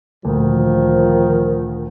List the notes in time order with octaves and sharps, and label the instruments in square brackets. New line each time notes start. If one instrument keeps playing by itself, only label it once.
[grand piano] D2 A#2 [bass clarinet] D#3 [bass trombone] F3